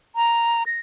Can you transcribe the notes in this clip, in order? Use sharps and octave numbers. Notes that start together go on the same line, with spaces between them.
A#5
A#6